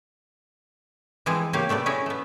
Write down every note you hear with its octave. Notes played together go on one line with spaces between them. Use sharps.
E3 F3 G#3 C4 G#4
C#3 A#3 G4 C#5 F5
C3 A3 B3 D5
C#4 E4 G#4 C#5 D#5
A3 B3